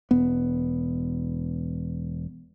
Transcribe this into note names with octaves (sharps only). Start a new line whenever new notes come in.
E1 B3